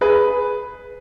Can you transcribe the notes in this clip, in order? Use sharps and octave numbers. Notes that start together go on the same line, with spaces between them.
G#4 B4